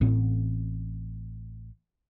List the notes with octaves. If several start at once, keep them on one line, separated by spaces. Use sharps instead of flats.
A1 A2 C4